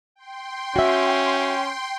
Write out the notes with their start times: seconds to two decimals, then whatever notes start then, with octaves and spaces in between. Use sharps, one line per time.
0.16 G5 C6
0.76 C#4 F#4 E5